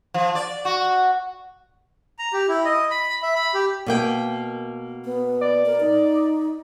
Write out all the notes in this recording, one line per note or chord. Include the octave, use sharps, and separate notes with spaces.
F3
D5
F#4
A#5
G4
E4
D#5
B5
E5
B5
G4
B2 A#3 G5
B3
D5
A#4
D#4